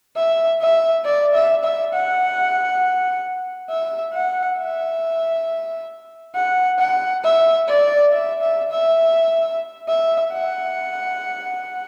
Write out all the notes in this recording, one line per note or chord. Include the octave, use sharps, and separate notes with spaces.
E5
E5
D5
E5
E5
F#5
E5
F#5
E5
F#5
F#5
E5
D5
E5
E5
E5
E5
F#5